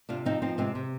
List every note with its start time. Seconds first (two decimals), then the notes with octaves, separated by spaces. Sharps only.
0.09 C3 D4 F4
0.25 F3 C4 D#4
0.42 F3 C4 D#4
0.58 C3 G#3 C4
0.75 C3